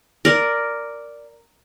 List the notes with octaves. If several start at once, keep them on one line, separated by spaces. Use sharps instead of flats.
A#4 D5